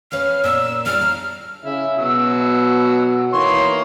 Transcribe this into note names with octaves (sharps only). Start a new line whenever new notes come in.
C#4 B4 F5 F6
A#2 E6
G3 D4 E4 F6
A#5
C#3 E4
B2 F#3 E6
D#3 E3 A#3 C#5 C6